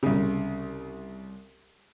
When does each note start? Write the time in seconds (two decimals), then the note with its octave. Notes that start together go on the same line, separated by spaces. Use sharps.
0.03 C2 C#3